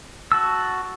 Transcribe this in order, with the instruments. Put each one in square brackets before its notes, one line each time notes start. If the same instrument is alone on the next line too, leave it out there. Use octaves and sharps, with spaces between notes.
[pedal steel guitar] F#4 A5 E6